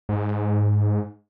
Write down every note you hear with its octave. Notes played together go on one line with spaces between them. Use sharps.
G#2